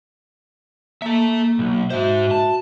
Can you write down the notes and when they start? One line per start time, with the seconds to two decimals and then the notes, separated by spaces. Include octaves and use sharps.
1.02 A#3 A4 E5
1.59 B1
1.90 G#2 F#4 C5 E5
2.31 A5